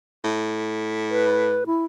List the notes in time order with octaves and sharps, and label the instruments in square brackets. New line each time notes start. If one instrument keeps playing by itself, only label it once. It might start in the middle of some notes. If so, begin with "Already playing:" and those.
[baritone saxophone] A2
[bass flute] B4
E4